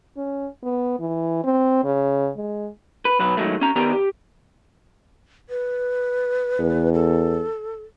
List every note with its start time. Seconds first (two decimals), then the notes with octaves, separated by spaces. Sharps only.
0.17 C#4
0.64 B3
1.00 E3
1.44 C4
1.84 C#3
2.37 G#3
3.05 B4
3.19 B1 F#3 B4
3.37 D#3 F#3 G#3 A3
3.61 C#4 A#5
3.76 D#3 B3 G4 A#4 D5 A#5
3.93 G4
5.50 B4
6.59 E2
6.94 A4